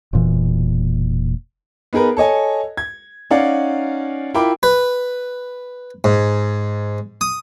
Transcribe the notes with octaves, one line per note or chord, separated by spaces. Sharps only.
E1 A#2 E3
B3 D#4 G#4 A#4 B4
A4 C#5 D#5 G#5
G#6
C#4 D#4 D5 F5 F#5
E4 F4 A#4 G5 B5 D6
B4
G#2
D#6